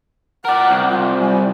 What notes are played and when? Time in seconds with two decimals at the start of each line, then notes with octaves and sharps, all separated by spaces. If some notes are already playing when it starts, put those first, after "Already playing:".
0.45 A#4 D5 F#5
0.69 C2
0.90 F4
1.19 G3 G#5